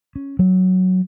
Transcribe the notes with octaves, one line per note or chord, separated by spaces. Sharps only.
C#4
F#3